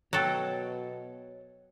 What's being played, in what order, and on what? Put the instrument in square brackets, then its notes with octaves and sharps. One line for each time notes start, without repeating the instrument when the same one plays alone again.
[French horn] B2 [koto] F#3 A4 [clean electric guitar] C#5 G5